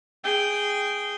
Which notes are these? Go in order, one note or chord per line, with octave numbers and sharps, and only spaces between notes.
G#4 G5